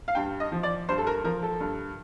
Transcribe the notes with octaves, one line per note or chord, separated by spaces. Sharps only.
F5
G2 G5
D#5
F3
D5
G2 C5
A4
A#4
F3 A#4
A4
G2